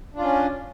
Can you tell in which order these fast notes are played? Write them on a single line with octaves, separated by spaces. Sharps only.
D4 F4 C#4